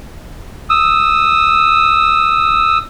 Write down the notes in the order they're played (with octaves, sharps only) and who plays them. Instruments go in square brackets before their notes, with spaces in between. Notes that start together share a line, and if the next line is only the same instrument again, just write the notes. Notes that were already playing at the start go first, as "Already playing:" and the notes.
[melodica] D#6 E6